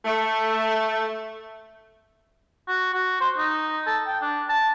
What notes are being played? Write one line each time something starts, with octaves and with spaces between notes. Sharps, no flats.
A3
F#4
F#4
C5
D#4
A4
G5
D4
A5